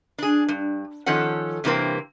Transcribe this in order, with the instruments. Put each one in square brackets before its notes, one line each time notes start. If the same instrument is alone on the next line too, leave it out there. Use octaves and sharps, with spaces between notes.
[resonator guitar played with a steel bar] D4 G#4
G2
D#3 F3 C#4 A4 F#5
G2 C3 E3 A#3 C4